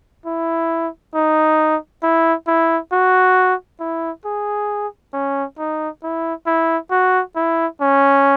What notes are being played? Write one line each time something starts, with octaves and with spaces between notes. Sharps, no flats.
E4
D#4
E4
E4
F#4
E4
G#4
C#4
D#4
E4
E4
F#4
E4
C#4